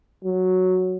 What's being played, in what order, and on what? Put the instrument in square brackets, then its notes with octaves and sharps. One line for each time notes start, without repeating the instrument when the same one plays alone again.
[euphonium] F#3